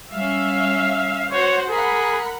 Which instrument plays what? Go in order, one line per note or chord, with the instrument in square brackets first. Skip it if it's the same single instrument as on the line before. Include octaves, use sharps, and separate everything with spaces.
[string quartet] G3 C#4 [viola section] E5 F5
[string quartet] F#4 [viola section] C5 F#5 [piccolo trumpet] C#5
[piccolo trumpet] G#4 [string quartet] A#4 F#5 [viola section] B5